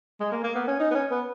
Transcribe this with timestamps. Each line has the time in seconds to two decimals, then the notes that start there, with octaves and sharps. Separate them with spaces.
0.20 G#3
0.32 A#3
0.43 A#3
0.55 B3
0.67 C#4
0.79 D#4
0.91 B3
0.95 C#4
1.11 B3